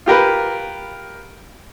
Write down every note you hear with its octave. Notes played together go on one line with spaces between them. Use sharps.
F4 G4 A#4 B4